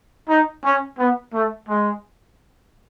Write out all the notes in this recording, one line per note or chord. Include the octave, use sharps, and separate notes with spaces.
D#4
C#4
B3
A3
G#3